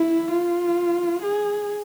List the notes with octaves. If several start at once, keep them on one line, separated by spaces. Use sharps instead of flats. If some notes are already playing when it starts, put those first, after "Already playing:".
Already playing: E4
F4
G#4